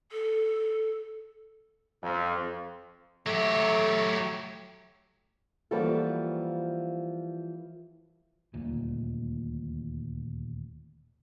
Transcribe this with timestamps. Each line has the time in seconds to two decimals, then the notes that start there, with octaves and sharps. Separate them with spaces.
0.12 A4
2.02 F2
3.26 F#3 A3 G4
5.71 E3 F3 G3 A#3 F#4 A4
8.54 D#1 D2 A#2